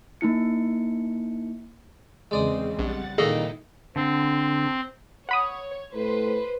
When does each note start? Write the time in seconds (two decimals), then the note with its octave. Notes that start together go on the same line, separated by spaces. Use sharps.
0.21 A#3 D#4 E4 C#7
2.31 E2 C#3 G#3 C4 D5 D#6
2.79 A#1 G3 F#5 A6
3.18 A#2 D#3 A#3 D#4 E4 G#4 A4 D#5
3.96 D3 C4
5.29 C#5 F#5 B5 D#6
5.95 A2 B4 C5